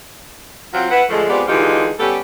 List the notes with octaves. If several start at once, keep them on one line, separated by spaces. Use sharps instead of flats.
F#3 C4 F4
E4 B4 F#5
D3 F3 G#3 A3
G#3 B3 C4 F4 G4 D5
D3 E3 G#3 D#4 F4 G4
G3 B3 C#4 G4 A4